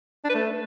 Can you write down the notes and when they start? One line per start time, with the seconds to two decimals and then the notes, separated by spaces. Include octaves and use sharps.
0.24 D4
0.29 B4
0.34 A3